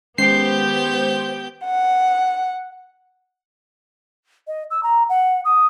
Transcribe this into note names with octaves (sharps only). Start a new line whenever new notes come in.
D#3 G#3 B3 C#4 G4 C5 G6 C7
F#5
D#5
E6
A#5
F#5
D#6